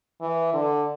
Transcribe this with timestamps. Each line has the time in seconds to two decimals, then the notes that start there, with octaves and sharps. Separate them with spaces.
0.21 E3
0.54 D3